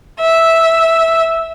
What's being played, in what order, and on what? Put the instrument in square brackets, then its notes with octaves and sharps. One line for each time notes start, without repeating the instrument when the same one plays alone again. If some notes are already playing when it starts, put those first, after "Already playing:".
[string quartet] E5